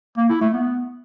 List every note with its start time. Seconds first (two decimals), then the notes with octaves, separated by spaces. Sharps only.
0.17 A#3
0.29 E4
0.41 A3
0.53 B3